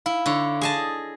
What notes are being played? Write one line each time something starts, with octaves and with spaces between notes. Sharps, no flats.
E4 F5
D3 C#5
G#4 D#5 A5